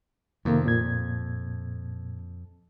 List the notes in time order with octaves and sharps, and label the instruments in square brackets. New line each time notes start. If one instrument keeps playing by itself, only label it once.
[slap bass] F2 [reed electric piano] C3 D#3 A#3
[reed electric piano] A#2 G#6